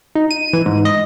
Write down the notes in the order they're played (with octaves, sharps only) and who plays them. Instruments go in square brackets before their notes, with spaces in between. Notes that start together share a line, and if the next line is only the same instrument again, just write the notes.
[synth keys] D#4
D#7
E3
G#2
D#5